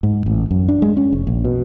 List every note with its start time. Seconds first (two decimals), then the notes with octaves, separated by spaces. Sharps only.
0.03 G#2
0.26 A1
0.51 F#2
0.68 D4
0.82 G#3
0.97 C#4
1.13 F1
1.27 A#1
1.45 B2